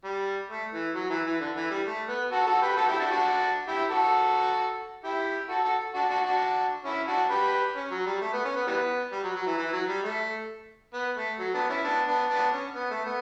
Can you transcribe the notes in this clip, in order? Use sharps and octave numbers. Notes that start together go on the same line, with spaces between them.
G3
A3
E3
F#3
E3
E3
D3
E3
G3
A3
B3
F#4 A4
F#4 A4
G4 B4
F#4 A4
E4 G4
D4 F#4
G4
D4 F#4
E4 G4
F#4 A4
E4 G4
F#4 A4
F#4 A4
D4 F#4
D4 F#4
D4 F#4
C#4 E4
D4 F#4
G4 B4
C#4
F#3
G3
A3
B3
C#4
B3
E3 G3 B3
G3
F#3
F#3
E3
E3
F#3
G3
A3
B3
A3
F#3
B3 D4
C#4 E4
B3 D4
B3 D4
B3 D4
C#4
B3
A3
B3